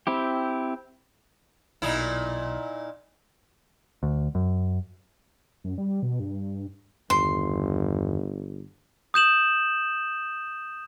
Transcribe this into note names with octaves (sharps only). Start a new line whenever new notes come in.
C4 E4 G4
B1 A#2 D#4 E4
D2
F#2
F#2
G3
B2
G2
G1 E2 G2 D#3 C6
D#6 G6 E7 F#7